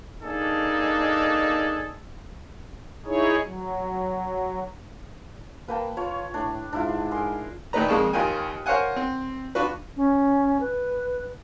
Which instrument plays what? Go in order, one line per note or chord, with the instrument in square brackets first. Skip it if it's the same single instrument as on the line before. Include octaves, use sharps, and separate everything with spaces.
[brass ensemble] A#3 D4 D#4 G#4 A4
[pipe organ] D#4 E4 G#4 C#5
F#3
[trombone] A#3 [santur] B4 G5 A5
[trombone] F4 [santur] C#5 A5
[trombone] A2 [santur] D4
[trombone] G#2 [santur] D4 E4 F4
[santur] G#4 A#4 C6
[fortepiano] A#2 D#3 A3 D#4 B4 A#5
F2 G#3 A#3 A5 C#6
D#2 F4 A#4 G5 G#5
A#4 C5 C#5 F5 F#5 G#5
C4
D4 F4 F#4 B4
[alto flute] C#4
B4